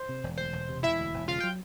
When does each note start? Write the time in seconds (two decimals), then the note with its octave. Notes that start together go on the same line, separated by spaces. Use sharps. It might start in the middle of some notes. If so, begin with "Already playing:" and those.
Already playing: C5
0.09 C3
0.24 E1
0.38 D2 C5
0.53 E1
0.69 C3
0.83 E1 E4 E5
0.98 D2
1.13 E1
1.28 C#3 F4 F5
1.40 F#3 G5